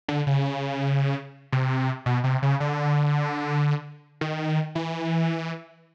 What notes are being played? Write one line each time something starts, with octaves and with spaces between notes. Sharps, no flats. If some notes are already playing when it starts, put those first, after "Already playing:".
D3
C#3
C3
B2
C3
C#3
D3
D#3
E3